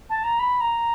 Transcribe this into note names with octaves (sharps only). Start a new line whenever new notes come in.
A5
A#5
B5
A#5